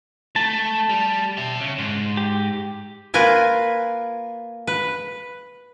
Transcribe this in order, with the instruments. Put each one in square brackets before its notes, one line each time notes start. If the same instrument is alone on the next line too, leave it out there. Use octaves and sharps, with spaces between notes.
[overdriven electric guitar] A3 [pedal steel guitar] A5
[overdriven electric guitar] G3
E5 G5
C#3
G#2
[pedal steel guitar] G4
[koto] A#3 F4 A#4 B4 G#5
B4